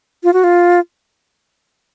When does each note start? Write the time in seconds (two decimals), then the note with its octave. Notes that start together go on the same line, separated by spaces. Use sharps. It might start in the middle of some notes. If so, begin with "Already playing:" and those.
0.24 F4
0.33 F#4
0.44 F4